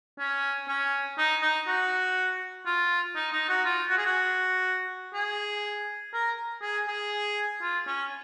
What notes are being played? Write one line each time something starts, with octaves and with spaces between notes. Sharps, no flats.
C#4
C#4
D#4
D#4
F#4
F4
D#4
D#4
F#4
F4
F#4
G#4
F#4
G#4
A#4
G#4
G#4
F4
C#4